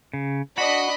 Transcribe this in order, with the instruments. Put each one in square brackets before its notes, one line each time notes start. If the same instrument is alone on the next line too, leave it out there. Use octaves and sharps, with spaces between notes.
[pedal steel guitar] C#3
[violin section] D4 D#5 B5 [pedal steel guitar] F#4